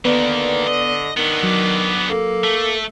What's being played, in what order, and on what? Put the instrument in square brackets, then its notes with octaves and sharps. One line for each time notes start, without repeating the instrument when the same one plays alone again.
[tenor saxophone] D3 [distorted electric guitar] D#3 A#3 [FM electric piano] B3 B4 [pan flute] D5
[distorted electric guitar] D#5
[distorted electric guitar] D3 B3 [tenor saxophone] D#3
[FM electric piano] F#3 [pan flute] D6
[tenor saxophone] A#3 [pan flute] A4
[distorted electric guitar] A3